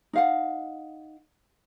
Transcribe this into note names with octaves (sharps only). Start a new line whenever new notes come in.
D#4 F5 F#5